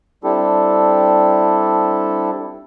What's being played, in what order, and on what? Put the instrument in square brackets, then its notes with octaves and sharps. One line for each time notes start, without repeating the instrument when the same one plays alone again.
[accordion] G3 C4 D4 E4 G4 A4